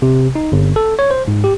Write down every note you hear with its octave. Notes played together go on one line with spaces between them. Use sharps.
C3
D#4
G1
A4
C#5
C5
G#2
G4